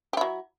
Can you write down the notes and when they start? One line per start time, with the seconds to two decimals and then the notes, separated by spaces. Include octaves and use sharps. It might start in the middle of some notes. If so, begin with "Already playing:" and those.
0.13 G4
0.17 E4
0.21 F#3